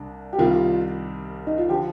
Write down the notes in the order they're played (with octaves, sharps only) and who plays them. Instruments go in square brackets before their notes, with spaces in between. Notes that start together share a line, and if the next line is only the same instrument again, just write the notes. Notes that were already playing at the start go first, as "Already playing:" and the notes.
Already playing: [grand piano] C2 D4
[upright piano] G4
[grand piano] C2 C3 D#3 G3 [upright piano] F4
[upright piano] D#4
F4
[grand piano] D3 F3 [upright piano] G4